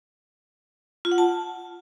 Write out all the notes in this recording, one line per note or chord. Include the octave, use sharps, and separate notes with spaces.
F4
F#5
A5